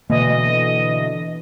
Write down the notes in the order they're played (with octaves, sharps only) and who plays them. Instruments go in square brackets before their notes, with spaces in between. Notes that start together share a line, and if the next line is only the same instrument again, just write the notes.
[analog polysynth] B2 D3 E3 [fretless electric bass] A#3 [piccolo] D#5